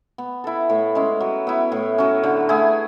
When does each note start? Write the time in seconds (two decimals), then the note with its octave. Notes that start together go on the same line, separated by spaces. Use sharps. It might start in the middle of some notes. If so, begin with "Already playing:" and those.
0.18 B3
0.44 E4 A4
0.69 A2
0.95 G#3 C#4 E4
1.20 F#3
1.47 B3 E4
1.72 A2
1.98 F#3 C#4
2.24 D3
2.49 A3 E4 G#4